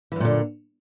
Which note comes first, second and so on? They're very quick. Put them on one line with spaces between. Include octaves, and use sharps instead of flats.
E3 F#2 A#2 D3